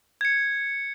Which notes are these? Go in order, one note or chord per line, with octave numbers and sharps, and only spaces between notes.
G#6 C#7